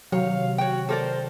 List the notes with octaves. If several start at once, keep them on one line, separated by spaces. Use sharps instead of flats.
C3 D#3 F#3 C#5 F5
F#4 C#5 G5
A4 A#4 C5 D5